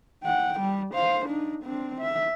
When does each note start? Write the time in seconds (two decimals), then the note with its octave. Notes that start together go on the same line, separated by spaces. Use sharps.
0.23 F#5 G5
0.60 G3
0.95 C5 F5
1.26 D4 D#4
1.64 C4 D4
2.01 E5